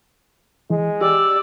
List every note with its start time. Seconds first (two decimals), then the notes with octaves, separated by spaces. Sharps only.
0.70 E3 G#3
1.01 G4 D5 E6